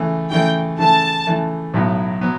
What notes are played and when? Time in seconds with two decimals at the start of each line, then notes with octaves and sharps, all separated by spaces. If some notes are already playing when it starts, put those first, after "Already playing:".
Already playing: C#3 E3 A3
0.31 C#3 E3 A3 G5
0.79 C#3 E3 A3 A5
1.27 C#3 E3 A3
1.74 B1 A2 F#3 B3
2.21 F#3 B3